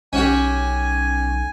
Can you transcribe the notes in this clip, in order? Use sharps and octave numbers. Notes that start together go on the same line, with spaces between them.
B1 C#4 F#4 G4 G#5